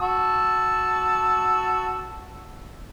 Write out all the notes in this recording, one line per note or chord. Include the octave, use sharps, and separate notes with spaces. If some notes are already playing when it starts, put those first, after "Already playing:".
F#4 A5 E6